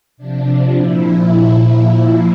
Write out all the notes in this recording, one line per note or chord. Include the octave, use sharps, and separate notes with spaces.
C3 F3 D4
A#2 F3 E4